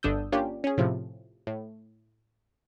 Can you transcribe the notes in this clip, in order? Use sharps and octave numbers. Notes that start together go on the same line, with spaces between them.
G1 D3 D4 D#6 E6 G6
A#3 C#4 D4 F4 G4
C#4 G#4
A2 C3 F3
A2